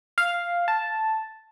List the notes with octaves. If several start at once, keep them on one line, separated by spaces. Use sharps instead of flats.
F5
A5